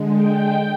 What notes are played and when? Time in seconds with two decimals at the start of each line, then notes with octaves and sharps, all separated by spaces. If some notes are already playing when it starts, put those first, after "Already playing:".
Already playing: D3 G#3
0.13 G5